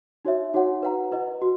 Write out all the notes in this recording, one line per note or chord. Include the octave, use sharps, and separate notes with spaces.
D#4 F#4 C#5 E5
D#4 F#4 C#5 F#5
B4 F#5 A#5
E4 B4 D#5
F#4